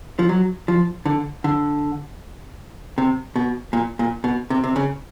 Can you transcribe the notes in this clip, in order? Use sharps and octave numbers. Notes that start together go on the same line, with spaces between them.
F3
F#3
F3
D3
D3
C3
B2
A#2
A#2
B2
C3
C3
C#3